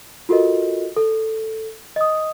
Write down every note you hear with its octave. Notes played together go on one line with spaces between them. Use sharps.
F4 F#4 A4 A#4 D#5
A4
D#5 D#6